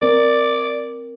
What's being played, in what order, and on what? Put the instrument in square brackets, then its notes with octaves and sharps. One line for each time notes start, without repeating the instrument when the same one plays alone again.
[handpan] C4 A#4 [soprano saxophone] D5